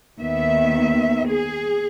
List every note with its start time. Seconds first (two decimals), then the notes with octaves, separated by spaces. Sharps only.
0.20 D#2 D#3 B3 E5
1.28 G#4